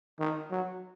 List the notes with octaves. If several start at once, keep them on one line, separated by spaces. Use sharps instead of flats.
D#3
F#3